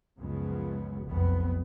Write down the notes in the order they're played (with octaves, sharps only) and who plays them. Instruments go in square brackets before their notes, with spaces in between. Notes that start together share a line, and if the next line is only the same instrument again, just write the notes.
[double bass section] C#2 F#2 C#3 F3 G#3 B3
F1 B1 F2 B3